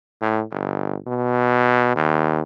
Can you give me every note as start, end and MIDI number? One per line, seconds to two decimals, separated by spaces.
0.22 0.43 45
0.51 0.96 31
1.07 1.94 47
1.96 2.41 39